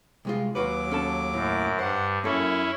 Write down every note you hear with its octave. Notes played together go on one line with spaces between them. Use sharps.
C2 G#3 F4
D#2 F#3 F4 F#4 B4 D6
C#4 A4 A5
F#2 A2
G2 C5 F#5
F#2 A#3 C#4 E4 A4